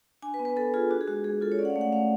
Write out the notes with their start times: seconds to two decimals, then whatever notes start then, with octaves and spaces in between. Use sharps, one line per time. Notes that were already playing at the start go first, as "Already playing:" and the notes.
0.22 D4 G#5
0.34 B4
0.39 B3
0.45 B4
0.56 B3 A4
0.74 F4 G#4
0.90 D4 F#4
1.01 G#4
1.08 G#3 F#4
1.24 G#3 G#4
1.41 F4 A4
1.52 C#5
1.59 C#4 D5
1.65 F#5
1.70 F5
1.76 A3
1.81 F#5
1.93 A3 F5